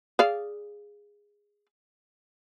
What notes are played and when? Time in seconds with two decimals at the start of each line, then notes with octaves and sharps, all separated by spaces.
0.19 G#4 D5 F5